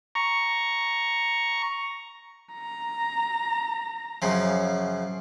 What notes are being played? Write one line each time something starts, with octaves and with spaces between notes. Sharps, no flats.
A#5 C#6
A#5
F#2 C#3 F3